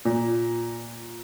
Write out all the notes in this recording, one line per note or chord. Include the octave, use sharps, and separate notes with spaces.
A#2